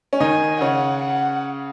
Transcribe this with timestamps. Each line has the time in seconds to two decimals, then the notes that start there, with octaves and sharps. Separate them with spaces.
0.13 C#4
0.20 D#3 D#4 G#5
0.61 C#3 C#4 F#5
1.03 F#5